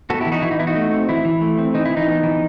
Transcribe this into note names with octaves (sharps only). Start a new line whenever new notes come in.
B3 F#4 A4
E4 G4
E3
D#4 F#4
E3 E4
D#4
B3 E4
D#4 F#4
A3
C4
E3 E4
E3
A3
C4
E3 D#4
E4
E3
D#4
B3
E3